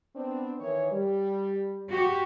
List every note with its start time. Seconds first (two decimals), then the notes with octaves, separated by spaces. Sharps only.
0.15 B3 C4 D4
0.60 D#3 E3 C#5
0.92 G3
1.89 F#4 G4